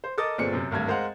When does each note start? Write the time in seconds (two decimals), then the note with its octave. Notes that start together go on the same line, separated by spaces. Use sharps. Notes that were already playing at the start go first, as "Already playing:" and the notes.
0.04 C5
0.18 A4 A#4 D#5 D6 D#6 A6
0.38 G1 A#2 C4 G#4 D5 C#7
0.53 F#2 C3
0.71 G#1 D2 G2 G#6
0.87 G#3 A#4 C5 D#5 F5 F#5